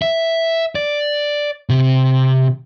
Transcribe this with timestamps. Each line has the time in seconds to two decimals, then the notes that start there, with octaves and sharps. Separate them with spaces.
0.02 E5
0.75 D5
1.69 C3